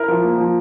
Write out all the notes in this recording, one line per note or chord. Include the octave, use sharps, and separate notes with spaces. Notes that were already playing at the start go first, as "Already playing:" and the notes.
Already playing: E4 A#4
F3
A#3
F3